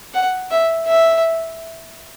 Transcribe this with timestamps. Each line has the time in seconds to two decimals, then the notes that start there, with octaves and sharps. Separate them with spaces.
0.14 F#5
0.51 E5
0.87 E5